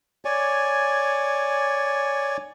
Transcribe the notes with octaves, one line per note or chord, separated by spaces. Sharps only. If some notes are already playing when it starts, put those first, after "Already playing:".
C#5 D5 G#5